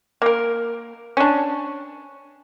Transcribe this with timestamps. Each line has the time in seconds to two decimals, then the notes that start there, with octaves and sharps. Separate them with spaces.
0.22 A#3 A#4
1.17 C#4 D4